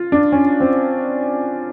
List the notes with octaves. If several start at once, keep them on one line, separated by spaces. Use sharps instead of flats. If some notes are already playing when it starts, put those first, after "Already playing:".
Already playing: F4
D4
C#4
C4